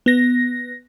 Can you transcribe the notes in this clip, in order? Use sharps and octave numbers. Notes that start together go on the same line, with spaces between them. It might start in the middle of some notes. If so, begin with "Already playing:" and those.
B3 A#6